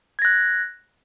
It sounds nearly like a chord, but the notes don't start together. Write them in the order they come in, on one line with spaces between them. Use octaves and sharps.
G#6 A#6 F#6